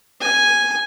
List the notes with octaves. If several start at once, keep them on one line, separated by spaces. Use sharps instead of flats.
G#5